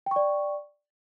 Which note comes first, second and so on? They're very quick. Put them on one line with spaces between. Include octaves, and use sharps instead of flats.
G5 C#6 D5